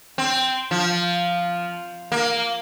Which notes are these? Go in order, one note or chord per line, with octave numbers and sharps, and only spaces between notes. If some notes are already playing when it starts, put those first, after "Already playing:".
C4
F3
A#3